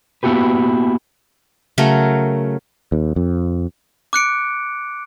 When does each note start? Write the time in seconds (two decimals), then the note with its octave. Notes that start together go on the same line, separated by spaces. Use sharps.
0.23 A#3 B3 E4 F#4 G4 B4
1.78 C#3 F#3 A3 A#4
2.92 D#2
3.16 F2
4.13 D6 F#6 C#7 D7